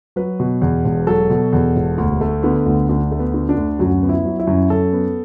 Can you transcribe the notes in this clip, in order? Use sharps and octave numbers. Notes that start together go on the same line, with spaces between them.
F#3 B4
B2
E2
E1
F#3 A4
B2
E2
E1
D2
A3
D3 B3
D2
D2 D4
A3
B3
D3
D4
D2
F#2 F#4
B3
E4
F#3
E4
F#2
F#2 A4
B3